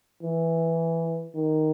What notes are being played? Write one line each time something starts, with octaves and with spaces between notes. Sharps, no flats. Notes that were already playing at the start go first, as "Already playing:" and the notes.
E3
D#3